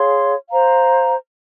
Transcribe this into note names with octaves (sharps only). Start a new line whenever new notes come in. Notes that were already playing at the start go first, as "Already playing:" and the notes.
Already playing: G#4 C#5 F5 C6
C5 F5 A#5